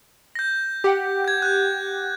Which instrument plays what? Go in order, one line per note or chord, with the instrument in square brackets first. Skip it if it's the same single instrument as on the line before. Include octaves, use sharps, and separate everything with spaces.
[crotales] G6 A#6
[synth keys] G4 F#5 G5
[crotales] G6 G#6
F#6 G6